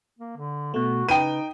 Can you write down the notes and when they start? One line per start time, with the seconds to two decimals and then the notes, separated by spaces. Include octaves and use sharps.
0.19 A#3
0.37 D3
0.74 B2 A3 F#4
1.09 C#3 D#4 B4 G5 D#7